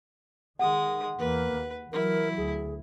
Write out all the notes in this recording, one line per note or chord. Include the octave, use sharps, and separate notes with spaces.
D#3 G#3 F#5 D#6
E2 A#3 B4
D#2
E3 F#3 E4 A#4
D2 G#4